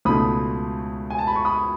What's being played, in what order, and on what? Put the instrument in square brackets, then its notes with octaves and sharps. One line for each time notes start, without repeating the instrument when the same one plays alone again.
[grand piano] C#2 B2 A3 D#4 B5 D#6
G#5
A5
B5
C#6
B5 D#6